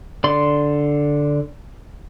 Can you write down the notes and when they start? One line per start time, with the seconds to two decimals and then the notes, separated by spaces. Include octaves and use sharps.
0.24 D3 D5 C6